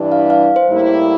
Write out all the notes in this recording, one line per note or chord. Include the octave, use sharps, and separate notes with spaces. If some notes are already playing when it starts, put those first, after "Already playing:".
Already playing: G2 E3 G3 D4
F5
F5
C5
A2 G3 A#3 E4